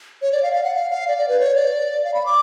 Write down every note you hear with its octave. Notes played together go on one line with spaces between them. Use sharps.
C#5
D5
F5
F5
F#5
F5
F5
D5
D5
B4
C#5
D5
F5
B5
D6